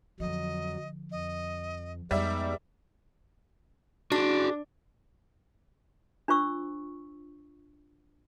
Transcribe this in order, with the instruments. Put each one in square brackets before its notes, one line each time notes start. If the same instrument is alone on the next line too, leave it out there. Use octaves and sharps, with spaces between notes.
[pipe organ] F2 F#3 [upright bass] D3 F3 [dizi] D#5
[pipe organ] F2 [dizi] D#5
[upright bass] F2 [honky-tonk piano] G3 E5 [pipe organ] G#3 B3 D#4 [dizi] D6
[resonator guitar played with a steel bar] D4 [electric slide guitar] F#4 G#4
[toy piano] D4 F4 C5 C#6 E6